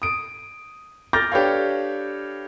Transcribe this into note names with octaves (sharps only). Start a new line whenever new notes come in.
D#6 D7
D6 F6 G6 A6 A#6
D4 G4 A4 B4 C#5 F5